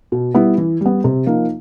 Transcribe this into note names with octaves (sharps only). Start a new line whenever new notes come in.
B2
G3 B3 E4
E3
G3 B3
C3
F3 A#3 D#4